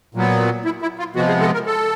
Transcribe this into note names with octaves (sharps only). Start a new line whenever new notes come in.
A#2 F#3 B3
E4
E4
F4
C3 F3 G#3 B3 F#4
G#4
A4
A#4
A4